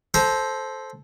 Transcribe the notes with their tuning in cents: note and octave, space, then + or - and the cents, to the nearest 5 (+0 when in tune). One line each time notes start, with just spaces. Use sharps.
A4 -15 C5 +0 A#5 +25